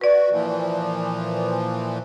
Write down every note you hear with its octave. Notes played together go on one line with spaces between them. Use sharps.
F#4 B4 D5
A#2 E3 F3